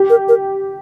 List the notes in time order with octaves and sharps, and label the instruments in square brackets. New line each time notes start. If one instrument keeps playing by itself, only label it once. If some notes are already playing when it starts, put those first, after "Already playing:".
Already playing: [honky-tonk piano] G4
[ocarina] A#4
A#4